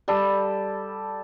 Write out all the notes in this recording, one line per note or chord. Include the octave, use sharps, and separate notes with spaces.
G3 A4